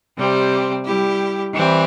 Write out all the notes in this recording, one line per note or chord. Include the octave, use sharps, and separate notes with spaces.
C3 G3 C4 G4
G3 E4 G4
E3 G3 C4